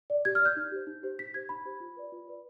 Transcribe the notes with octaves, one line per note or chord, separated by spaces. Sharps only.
D5
G4 G#6
D5 F6
G6
D#4
G4 C5
D#4
G4 C5
D#4 B6
G4 C5 G#6
D#4 B5
G4 C5
F4
B4 D5
F4
B4 D5